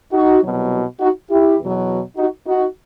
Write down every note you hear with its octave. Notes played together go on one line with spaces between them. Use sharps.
D#4 F#4
C2 B2 F#3
D#4 F#4
E4 G4
E2 B2 F#3
D#4 F#4
D#4 F#4